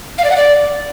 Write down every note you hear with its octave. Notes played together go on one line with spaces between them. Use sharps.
F5
D5
F#5
D5